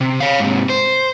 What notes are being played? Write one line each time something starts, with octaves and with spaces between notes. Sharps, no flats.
C3
C#5 F5
G#2 C3
C5